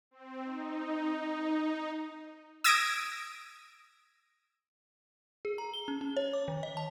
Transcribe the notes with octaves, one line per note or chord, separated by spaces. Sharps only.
C4
D#4
D#6 E6 G#6 A#6 D7
G#4
A#5
G7
C#4
C#4
C#5
D6
D#3
D#5
A5